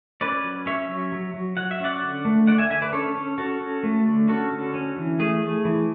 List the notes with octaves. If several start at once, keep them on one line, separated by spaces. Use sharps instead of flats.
C#4 B4 D5
F#3
C#4 C#5 E5
F#3
F#3
F#3
F#3 F#5
E5
C#4 D5 F#5
D3
A3
D3 D5 F#5
E5 G#5
D3 E5 G#5
B4 D5
C#4 A4 C#5
C#4
C#4 F#4 A4
C#4
A3
D3
C#4 F#4 A4
D3
C#4
E3
A3 G#4
A3
E3